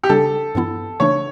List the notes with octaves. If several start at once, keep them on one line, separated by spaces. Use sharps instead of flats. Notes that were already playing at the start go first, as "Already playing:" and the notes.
G4
C#3 G3 D4 A4
G2 E3 B3 E4
C#3 E3 A3 D4 C#5